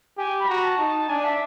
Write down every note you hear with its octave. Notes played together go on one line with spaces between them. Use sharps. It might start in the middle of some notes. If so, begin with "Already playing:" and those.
G4 G#5
B5
F#4 A#5
A5
D#4
D4 G#5
E5